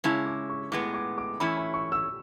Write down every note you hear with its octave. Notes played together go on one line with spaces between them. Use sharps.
C#3 G#3 C#4 E4 A5
D6
C#6
A2 G#3 B3 D6
D6
D6
E3 A3 C#4 E4 B5
B5
C#6
E6